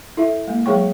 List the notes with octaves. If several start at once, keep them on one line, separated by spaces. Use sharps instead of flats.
E4 A4 E5
G#3 A#3
F#3 G#3 G#4 C#5 G5 C#6